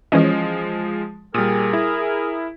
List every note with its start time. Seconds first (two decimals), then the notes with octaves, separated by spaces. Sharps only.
0.12 E3 F3 G#3 C#4 D#5
1.34 A#2 G3 G#4 A#4 D#6
1.73 E4